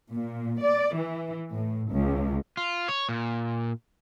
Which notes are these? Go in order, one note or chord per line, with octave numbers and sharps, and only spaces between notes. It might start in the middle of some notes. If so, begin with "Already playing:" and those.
A#2
D5
E3
A2
C#2
F4
C#5
A#2